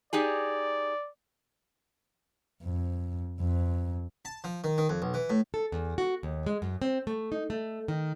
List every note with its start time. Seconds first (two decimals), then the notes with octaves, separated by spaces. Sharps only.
0.13 D#4 G4 G#4 D5
2.64 F2
3.40 F2
4.25 A5
4.44 F3
4.64 D#3
4.78 D#3
4.89 F2
5.02 B1
5.14 E3
5.30 A2
5.54 A4
5.72 E2
5.98 F#4
6.23 D#2
6.46 G#3
6.62 F#2
6.82 C4
7.07 A3
7.32 D#4
7.50 A3
7.88 D#3